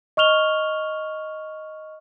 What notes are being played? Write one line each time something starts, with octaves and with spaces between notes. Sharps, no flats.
D#5 C#6 F6 F7 G7